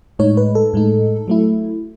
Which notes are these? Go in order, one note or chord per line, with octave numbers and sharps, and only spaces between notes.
A2 G#3 D#4 C#5
B4
A4
A2 G#3 D#4
F#3 A3 E4